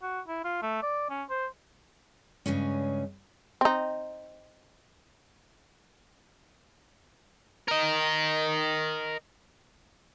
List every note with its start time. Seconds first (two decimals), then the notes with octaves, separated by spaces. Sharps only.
0.03 F#4
0.28 E4
0.44 F4
0.62 A3
0.83 D5
1.10 C#4
1.30 C5
2.46 G2 C#3 G#3 C#4
3.61 C4 D#4
7.68 A#4 D#5